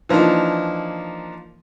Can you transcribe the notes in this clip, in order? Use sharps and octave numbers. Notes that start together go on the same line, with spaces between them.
E3 F3 A#3 D4 D#4